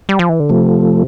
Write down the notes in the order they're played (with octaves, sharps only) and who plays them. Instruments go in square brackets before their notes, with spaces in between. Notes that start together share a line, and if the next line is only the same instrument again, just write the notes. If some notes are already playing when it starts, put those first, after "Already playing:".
[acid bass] G3
F3
E3
D3
[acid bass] C3 [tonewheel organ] F3 A3